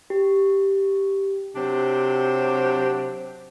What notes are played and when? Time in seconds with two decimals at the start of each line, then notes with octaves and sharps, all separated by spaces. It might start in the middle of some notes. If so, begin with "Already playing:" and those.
0.10 G4
1.55 C3 F#3 D4 G4 C5